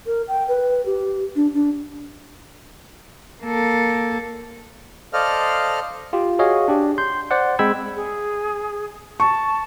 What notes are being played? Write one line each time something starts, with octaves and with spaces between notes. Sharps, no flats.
A#4
G5
B4
G4
D4
D4
A#3 A4
A4 C5 D5 D#5 F5 F6
F4 G4
F#4 G#4 C#5 D#5 F5
D4 G4
C6 G6
C5 D5 F#5
G#3 C4 G5 B5 E6 G#6
G#4
A5 C#6